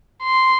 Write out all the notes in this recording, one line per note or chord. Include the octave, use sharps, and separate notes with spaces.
C6